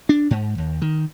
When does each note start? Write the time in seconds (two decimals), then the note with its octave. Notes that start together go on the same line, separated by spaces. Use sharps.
0.09 D4
0.31 G#2
0.58 D#2
0.82 D#3